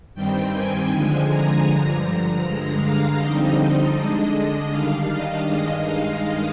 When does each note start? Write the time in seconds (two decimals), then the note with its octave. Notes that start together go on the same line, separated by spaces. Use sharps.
0.15 G2 D#3 G3 C4 G5
0.53 G#5
0.91 D3 F3 G#3 G#5
1.30 A#5
1.67 G2 D3 F3
2.43 G2 D3 G#3 A#5
2.81 F5
3.19 F2 D3 G3 C4 D#4 D#5
3.95 D3 G#3 D4
4.71 D#3 G3 D4 F5
5.09 D#5
5.46 G2 D#3 G#3 D#5
5.85 F5